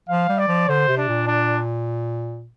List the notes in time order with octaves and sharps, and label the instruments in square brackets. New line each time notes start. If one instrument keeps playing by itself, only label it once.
[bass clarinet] F3 [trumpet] F5
[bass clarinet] G3
[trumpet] D5
[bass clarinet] F3
[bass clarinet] D3 [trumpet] C5
[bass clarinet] C3
[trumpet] D4
[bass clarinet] A#2
[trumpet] D4